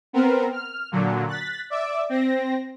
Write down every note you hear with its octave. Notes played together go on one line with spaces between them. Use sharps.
B3 C4 A#4
F6
A#2 D3 F#3
F#6 A6 B6
D5 E5 D6
C4 A#6